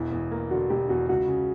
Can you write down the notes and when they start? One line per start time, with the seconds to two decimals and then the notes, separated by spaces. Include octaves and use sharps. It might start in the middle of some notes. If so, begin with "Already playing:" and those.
Already playing: E1 E2 E4
0.12 E2
0.31 A#3
0.51 D3 F#4
0.70 E1 G4
0.89 E2 F#4
1.09 C#2 F#4
1.28 C#3